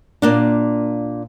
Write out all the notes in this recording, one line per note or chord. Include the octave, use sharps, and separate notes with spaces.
A#2 A#3 D4